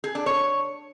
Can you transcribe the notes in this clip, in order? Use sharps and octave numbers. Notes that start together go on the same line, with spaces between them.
G#4
D4
C#5